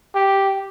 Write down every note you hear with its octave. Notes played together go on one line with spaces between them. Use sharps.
G4